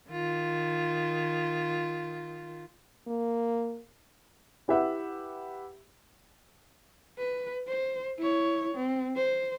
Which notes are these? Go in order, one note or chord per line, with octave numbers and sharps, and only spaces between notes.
D#3 F4
A#3
E4 G4 B4 E5 F#5
B4
C5
E4 C#5
C4
C5